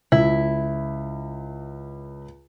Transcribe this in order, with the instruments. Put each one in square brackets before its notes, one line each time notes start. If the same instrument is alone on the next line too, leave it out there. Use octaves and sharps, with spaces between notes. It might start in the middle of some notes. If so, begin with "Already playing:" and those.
[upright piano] C#2 [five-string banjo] E4